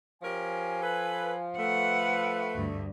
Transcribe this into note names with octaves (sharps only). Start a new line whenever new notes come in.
F3 C#4 G4 A#4 G#5
A4 B4
A3 B4 F#5
D2 G2